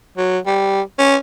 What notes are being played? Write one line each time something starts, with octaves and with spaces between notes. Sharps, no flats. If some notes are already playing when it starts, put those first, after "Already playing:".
F#3
G3
C#4